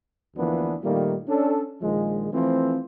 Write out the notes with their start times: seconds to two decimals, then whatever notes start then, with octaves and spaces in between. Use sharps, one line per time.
0.35 D2 E3 F3 A#3 B3 D4
0.82 A#2 D#3 G3 A3 A#3
1.28 C#4 D4 A4
1.81 A#1 D#3 F3 G#3
2.32 E3 F3 A3 C4